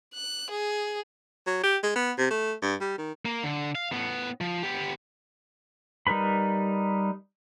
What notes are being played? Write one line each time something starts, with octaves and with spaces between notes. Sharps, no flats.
F#6
G#4
F#3
G4
G#3
B3
C3
A3
G2
G3
D#3
A#3
D3
F5
A2 B3
F3
B3 G4
G3 D#4 A#4 B4 B5